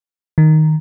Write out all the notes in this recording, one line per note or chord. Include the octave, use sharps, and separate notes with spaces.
D#3